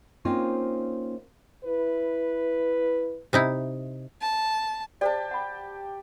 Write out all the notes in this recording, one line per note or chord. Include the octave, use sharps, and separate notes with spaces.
A#3 C4 C#4 D#4 F4
E4 B4
C3 D#4 E4
A5
G4 G#4 C5 D5 A5
F#5 B5